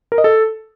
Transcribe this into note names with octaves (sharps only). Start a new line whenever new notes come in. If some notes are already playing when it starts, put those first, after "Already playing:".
A#4
D#5
A4